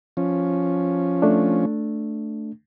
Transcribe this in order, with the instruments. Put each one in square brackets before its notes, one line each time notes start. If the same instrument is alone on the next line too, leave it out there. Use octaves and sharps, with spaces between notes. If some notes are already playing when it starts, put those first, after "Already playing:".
[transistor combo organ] F3 C#4
[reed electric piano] A3 D4